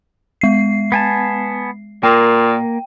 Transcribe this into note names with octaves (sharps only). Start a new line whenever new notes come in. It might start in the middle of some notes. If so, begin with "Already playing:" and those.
G#3 C7
B3 G#5 A5
A#2 A#3 G5